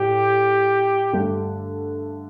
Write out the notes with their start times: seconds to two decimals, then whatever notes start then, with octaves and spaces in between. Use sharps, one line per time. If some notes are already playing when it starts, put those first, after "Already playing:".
Already playing: A2 G4
1.13 G2 D3 A3 D4